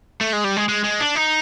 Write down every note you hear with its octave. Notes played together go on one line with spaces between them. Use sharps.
A3
G#3
G3
G#3
G#3
G#3
D4
D#4